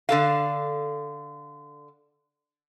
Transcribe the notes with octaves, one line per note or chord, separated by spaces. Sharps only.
D3 A4 F5